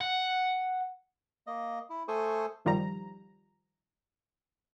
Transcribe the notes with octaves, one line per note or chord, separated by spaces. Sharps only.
F#5
A#3 D#5
E4
A3 A4 C5 G#5 C#6 D#6
G1 D#3 F3 G3 A#5